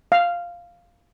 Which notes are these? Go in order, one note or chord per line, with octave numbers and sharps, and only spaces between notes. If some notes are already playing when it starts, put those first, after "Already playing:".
F5